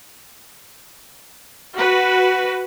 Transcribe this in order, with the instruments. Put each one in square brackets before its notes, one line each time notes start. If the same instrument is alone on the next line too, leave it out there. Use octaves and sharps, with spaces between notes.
[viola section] F#4 B4